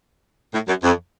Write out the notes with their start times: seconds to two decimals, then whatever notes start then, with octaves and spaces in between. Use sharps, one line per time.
0.53 A2
0.68 F#2
0.83 F2